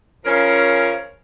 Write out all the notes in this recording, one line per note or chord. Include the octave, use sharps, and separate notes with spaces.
C#3 F3 C#4 A#4